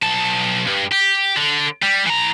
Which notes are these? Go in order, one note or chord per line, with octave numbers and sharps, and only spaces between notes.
B1 A5
G2
G4
D3
G3
E3 A#5